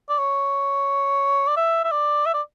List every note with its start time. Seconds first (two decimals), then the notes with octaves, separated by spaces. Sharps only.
0.09 D5
0.18 C#5
1.47 D5
1.57 E5
1.84 E5
1.91 D5
2.26 E5
2.34 D5